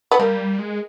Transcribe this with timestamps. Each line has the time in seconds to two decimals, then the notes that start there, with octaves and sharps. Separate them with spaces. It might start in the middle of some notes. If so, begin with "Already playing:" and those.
0.11 B3
0.19 G3 A#3
0.58 G#3